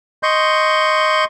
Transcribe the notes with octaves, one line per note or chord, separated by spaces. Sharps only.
D#5 C6 C#6 G6